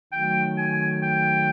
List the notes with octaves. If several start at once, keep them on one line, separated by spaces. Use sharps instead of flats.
D#3 F#3 A3 G5
G#5
G5